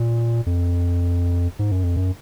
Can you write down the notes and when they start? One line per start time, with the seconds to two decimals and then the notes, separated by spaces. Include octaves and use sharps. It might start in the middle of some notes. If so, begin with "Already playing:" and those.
Already playing: A#2
0.46 F2
1.59 G#2
1.72 F#2
1.84 F2
1.96 F#2